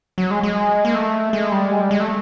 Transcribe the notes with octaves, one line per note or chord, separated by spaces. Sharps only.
F#3
G#3
G#3
A#3
A3
G#3
G3
G#3
G3
G#3
A3